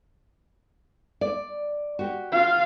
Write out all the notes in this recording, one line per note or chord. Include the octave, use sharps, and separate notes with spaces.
D5
F#4 G4
F4 F5